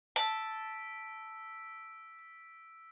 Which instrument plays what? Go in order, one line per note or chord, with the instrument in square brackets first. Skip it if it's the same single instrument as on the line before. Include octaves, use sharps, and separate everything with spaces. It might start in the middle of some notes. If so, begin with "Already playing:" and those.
[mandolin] A5 [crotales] E6 B6 D7